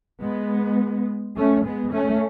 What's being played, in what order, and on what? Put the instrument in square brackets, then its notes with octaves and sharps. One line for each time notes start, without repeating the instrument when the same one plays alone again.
[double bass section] G#3 B3
A3 C#4
G#3 B3
A3 C#4